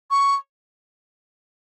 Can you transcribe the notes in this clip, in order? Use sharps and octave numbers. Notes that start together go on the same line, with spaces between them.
C#6